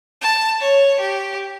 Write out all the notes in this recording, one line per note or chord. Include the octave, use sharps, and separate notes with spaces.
A5
C#5
G4